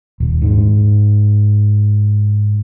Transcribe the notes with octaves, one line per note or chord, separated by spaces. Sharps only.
D#1
G#2